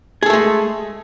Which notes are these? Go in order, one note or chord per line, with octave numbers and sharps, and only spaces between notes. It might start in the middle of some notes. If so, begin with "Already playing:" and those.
G#3 A3 G#4 A4